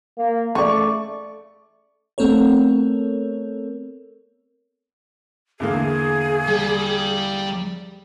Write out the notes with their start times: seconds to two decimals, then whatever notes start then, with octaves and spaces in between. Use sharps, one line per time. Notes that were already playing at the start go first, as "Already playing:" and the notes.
0.17 A#3
0.55 A3 D5 C#6
2.18 A3 B3 C4 A4 A#4 C#5
5.60 E2 D3 A#3 G#4
6.48 G3